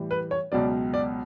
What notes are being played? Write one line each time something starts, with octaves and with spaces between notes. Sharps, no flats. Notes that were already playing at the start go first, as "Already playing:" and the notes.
Already playing: A2 E3 G3
B4
C#5
C#2 B2 F#3 D5
D5